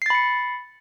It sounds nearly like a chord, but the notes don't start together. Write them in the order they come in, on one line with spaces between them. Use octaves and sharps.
C7 A6 B5 C#7